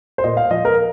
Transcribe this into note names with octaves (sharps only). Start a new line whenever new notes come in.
C5
A#2 D#5
F5
F3 D#5
A#4